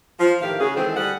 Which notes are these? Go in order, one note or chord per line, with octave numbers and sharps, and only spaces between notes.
F3
A2 D#3 E3 G4 A#4 F5
C#3 F#4 G#4
D#3 E3 G#3 C4 G#4 A4
D2 G3 G#4 F#5